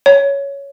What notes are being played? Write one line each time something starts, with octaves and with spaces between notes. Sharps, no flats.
C#5